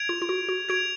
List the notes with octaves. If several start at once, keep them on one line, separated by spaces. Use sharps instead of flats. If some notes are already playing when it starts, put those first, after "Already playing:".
Already playing: G#6 D7 F7
F4
F4
F#4
F#4
F#4 G#6 D7 F7